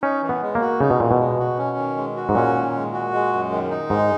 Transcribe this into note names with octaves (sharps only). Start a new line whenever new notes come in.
C#4 D#4
E3
B3
G#3
A#3
F#4
C#3 D#4
B2
A#2 E3
B2
G#3
F#4
C#4
D#3
G#3
F#4
G#2
A#2 C#4
D#3
G#3
F#4
G#3
F#2
D#3
D#4
G#2 G#3